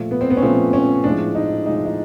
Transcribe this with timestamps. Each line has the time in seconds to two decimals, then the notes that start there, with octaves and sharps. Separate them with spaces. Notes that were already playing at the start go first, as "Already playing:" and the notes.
Already playing: A#2 F3 A3
0.11 B3
0.21 C4
0.30 B3
0.37 C#4
0.42 A#2 F3 A3 C4
0.73 C#4
1.04 A2 F3 G#3 D4
1.35 D#4
1.66 A2 F3 G#3 D#4
1.86 D#4